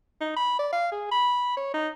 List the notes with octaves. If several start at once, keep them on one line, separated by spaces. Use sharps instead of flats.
D#4
B5
D5
F5
G#4
B5
C#5
D#4